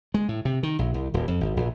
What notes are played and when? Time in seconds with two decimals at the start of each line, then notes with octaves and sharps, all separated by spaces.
0.14 G#3
0.29 A2
0.45 C3
0.63 D#3
0.79 A#1
0.94 C2
1.14 D#1
1.28 F2
1.41 G#1
1.57 A#1